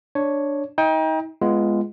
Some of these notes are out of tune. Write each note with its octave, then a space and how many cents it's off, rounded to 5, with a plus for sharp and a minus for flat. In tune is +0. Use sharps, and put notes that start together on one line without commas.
D4 +0 C#5 +0
D#4 +30 G5 +20
G#3 +0 B3 +0 F4 -20